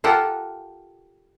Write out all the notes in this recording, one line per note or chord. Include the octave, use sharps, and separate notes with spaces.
F4 G4 A4 A#4 F#5 G5